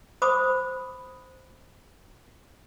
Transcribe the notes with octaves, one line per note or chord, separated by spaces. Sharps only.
C5 B5 D6 D#6